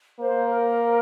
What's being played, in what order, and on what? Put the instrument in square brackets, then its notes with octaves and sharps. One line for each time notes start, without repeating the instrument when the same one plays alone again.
[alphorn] A#3 [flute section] C5
[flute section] A#4